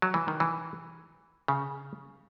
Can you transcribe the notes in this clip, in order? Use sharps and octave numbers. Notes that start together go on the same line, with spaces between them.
F#3
E3
D#3
E3
C#3